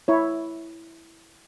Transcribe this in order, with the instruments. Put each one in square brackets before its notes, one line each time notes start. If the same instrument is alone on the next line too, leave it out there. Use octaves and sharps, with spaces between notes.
[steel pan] E4 C#5